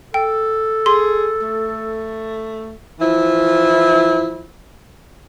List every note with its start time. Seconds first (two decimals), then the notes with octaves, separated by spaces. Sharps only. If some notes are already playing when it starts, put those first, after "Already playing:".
0.14 A4 G5
0.86 G#4 C6
1.42 A3
3.00 E3 F3 E4